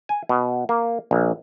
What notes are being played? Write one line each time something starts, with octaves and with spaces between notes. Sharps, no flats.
G#5
B2
A#3
A#1